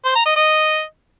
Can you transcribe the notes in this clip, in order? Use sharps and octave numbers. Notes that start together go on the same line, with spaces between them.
C5
A#5
D#5
D#5